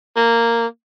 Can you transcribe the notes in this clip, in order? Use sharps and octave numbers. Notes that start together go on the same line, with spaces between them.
A#3